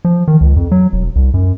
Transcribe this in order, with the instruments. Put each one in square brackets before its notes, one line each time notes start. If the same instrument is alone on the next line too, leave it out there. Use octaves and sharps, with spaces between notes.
[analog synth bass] F3
D#3
C#2
F2
F#3
E1
C2
F#2